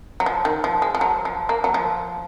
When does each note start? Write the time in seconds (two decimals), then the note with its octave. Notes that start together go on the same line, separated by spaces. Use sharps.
0.20 F#3
0.26 F3
0.45 D#3
0.64 F3
0.82 G#3
0.95 F3
1.01 F#3
1.25 F3
1.49 A#3
1.64 F#3
1.74 F3